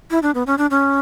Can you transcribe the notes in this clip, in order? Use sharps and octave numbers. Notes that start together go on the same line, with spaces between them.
E4
D4
B3
C#4
D4
C#4